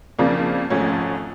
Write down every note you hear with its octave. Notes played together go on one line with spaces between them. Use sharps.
F2 C#3 F3 A#3 D4
G#1 G#2 F3 A3 C#4